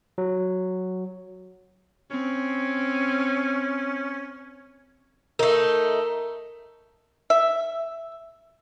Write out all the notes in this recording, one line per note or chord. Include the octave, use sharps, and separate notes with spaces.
F#3
C4 C#4
A3 D#4 A#4
E5